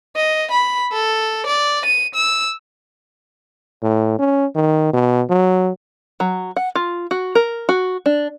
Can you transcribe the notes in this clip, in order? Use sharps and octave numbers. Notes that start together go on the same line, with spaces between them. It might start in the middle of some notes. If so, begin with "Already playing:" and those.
D#5
B5
A4
D5
D#7
E6
A2
C#4
D#3
B2
F#3
F#3
F#5
F4
F#4
A#4
F#4
D4